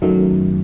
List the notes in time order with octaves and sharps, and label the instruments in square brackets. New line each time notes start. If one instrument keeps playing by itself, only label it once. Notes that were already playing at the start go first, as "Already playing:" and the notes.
[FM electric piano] F#2 D#3 F#3 A3